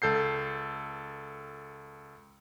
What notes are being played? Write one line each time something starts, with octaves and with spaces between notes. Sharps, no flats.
C#2 A4 G6 C7